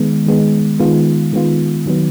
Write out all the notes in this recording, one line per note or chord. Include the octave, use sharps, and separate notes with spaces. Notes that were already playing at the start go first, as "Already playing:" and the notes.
Already playing: D#3 G#3 B3
D#3 G#3 B3
D#3 G#3 B3 F4
D#3 G#3 B3 F4
D#3 F#3 B3